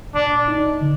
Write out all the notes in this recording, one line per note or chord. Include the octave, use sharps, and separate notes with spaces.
A#2 D4
D#4
D3